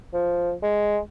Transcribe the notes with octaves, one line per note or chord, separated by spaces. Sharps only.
F3
G#3